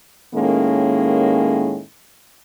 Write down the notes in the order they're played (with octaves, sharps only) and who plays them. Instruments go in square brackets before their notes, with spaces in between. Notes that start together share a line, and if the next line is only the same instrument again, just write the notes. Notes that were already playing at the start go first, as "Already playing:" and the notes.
[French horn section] A2 D#3 G#3 A#3 C#4